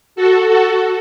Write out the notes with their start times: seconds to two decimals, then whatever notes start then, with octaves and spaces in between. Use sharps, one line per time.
0.16 F#4 A4
0.47 F#4 A4